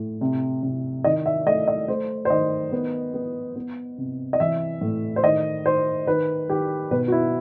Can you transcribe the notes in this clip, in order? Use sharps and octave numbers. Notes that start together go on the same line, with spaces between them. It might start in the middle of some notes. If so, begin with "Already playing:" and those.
Already playing: A2
C3
C3
D#3 D#5
E5
A3 D#5
D#5
A3 C5
C5
D#3 D#5
B3
B3
B3
C3
D#5
E3 E5
A2
C5
D#3 D#5
D#3 C5
D#3 B4
D#3 G4
B2 B4
F#4
E4